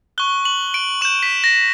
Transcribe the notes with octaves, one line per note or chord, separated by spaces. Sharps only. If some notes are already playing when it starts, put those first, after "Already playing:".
C#6 F#6 G7
F#7
D7
C#6 G6 E7
B6
A#6